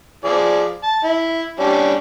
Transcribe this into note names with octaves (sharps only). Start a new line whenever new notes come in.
F3 G#4 D5
A5
E4
G3 C#4 D4